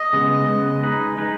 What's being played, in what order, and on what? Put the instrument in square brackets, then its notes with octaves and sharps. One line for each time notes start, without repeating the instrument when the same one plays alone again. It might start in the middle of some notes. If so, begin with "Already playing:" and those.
Already playing: [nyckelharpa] D#5
[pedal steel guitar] C#3 G#3 B3
C#3 G#3 B3
G#3 D#4 B4
G#3 D#4 B4